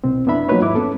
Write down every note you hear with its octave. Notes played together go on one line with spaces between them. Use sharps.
C2 B2 C4
F2 B3 D4 E4 E5 B5
F3 F#3 A#3 D#4 B4 C#5
D#2 G#2 E4 E5 D6
B3 C#4 A4